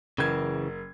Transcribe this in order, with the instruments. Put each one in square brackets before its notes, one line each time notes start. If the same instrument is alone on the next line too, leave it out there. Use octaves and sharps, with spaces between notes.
[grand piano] F#1 A#4 G#6 [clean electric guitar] C#3 E3